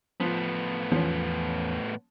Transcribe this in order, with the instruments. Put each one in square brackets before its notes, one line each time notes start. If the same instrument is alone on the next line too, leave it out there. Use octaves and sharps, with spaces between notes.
[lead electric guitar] A2 B3 [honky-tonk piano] F3
[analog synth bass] E2 [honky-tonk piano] F3 C#4